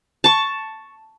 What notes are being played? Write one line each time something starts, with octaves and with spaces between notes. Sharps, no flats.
A5 C#6